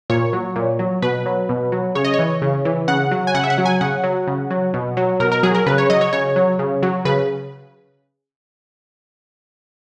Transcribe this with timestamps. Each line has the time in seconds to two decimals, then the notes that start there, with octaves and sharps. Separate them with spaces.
0.10 A#2 C#5
0.33 F#3
0.56 A#2
0.79 F#3
1.02 B2 B4
1.26 F#3
1.49 B2
1.72 F#3
1.95 C#3 C#5
2.05 D#5
2.14 C#5
2.19 E3
2.42 C#3
2.65 E3
2.88 C#3 F#5
3.11 F#3
3.27 G#5
3.34 C#3 F#5
3.44 E5
3.50 F#5
3.58 F#3
3.66 G#5
3.81 C#3 F#5
4.04 F#3
4.27 C#3
4.50 F#3
4.74 B2
4.97 F#3
5.20 B2 A#4
5.32 A#4
5.43 F#3 G#4
5.55 A#4
5.66 C#3 B4
5.78 C#5
5.90 F#3 D#5
6.01 C#5
6.13 C#3 C#5
6.36 F#3
6.59 C#3
6.83 F#3
7.05 C#3 B4